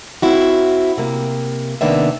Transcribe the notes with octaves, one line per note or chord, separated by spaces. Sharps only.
C4 E4 F#4
C3 A#3
C3 D#3 A#3 B3 D4 E5